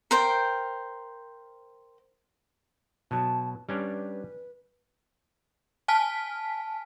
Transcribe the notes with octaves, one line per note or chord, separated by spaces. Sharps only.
A#4 C5 G5
B2 F#3 A5
G3 C#4 D4 B4
G#5 A5 F6 B6